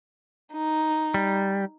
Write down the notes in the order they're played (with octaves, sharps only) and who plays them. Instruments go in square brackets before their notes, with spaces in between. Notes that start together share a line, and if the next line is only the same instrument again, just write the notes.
[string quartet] D#4
[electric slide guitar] G3